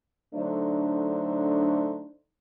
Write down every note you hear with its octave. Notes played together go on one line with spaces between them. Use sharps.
D3 F#3 A3 D4 D#4 C5